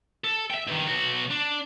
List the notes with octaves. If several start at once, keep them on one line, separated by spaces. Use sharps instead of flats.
A4
E5 G5
G2 D#3
B1 F#4
D4